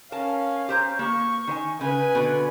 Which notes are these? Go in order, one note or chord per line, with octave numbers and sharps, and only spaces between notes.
C#4 A#4 F5 A5
G4 C5 A#5
A#3 G4 C#6
D#3 C5 G#5
C#3 B4 G#5
B2 D3